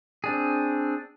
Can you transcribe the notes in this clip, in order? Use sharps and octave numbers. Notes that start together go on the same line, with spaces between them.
C4 D4 G#4